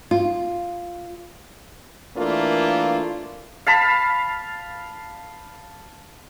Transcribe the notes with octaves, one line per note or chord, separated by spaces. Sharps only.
F4
E3 A3 A#3 D4 F4 A#4
F5 A5 B5